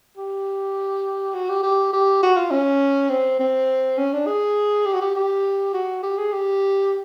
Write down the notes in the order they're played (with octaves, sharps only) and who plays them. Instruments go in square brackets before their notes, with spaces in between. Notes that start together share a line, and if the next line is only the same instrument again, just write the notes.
[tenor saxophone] G4
F#4
G4
G4
G4
F#4
F4
C#4
C4
C4
C#4
D4
G#4
G4
F#4
G4
G4
F#4
G4
G#4
G4